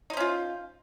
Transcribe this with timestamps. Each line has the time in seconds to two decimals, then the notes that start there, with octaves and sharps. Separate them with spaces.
0.10 D#4
0.13 C5
0.17 C#4
0.20 F4